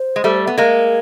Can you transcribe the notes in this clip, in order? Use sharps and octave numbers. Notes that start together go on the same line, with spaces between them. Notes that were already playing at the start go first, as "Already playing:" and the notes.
Already playing: C5
G#3
G3 A3
B3
G#3 A#3 A#4